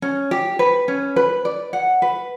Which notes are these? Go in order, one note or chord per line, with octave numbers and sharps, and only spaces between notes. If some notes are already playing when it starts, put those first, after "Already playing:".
C#4
G4
B4
C#4
B4
D5
F#5
B4